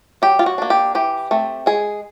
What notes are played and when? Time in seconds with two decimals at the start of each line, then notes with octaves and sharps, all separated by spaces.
0.22 F#3 G4
0.39 F4
0.46 F#4
0.58 A#3 D4
0.70 G4
0.95 E3 G4
1.31 A3 C4
1.66 G#3 G#4